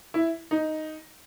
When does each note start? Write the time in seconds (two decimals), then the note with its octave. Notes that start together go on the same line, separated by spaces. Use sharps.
0.14 E4
0.51 D#4